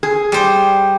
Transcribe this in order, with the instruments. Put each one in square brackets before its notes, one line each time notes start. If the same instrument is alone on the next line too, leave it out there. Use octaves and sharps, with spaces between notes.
[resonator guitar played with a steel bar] G#4
[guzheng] G3 C5